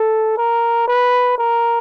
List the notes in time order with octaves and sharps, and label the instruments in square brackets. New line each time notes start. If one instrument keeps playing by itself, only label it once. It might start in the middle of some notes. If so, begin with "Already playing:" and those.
Already playing: [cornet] A4
A#4
B4
A#4